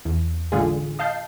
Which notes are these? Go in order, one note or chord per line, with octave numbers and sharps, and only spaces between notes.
E2
A1 D3 G#3 F4 G#4
D#5 F5 A5 G6 C7